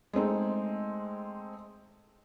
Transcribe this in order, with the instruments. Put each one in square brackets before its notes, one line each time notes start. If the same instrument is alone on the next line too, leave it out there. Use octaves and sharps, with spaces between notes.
[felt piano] G#3 A3 C4 D#4